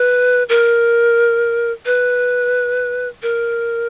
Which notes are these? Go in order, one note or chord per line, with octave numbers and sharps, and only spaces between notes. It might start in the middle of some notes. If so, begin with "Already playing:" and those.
Already playing: B4
A#4
B4
A#4